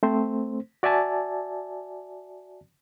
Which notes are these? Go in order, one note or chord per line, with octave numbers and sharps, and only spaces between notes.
A3 C4 C5
F#4 D5 E5 G#5 A5